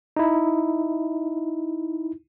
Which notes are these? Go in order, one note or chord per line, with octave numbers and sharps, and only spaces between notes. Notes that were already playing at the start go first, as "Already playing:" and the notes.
D#4 E4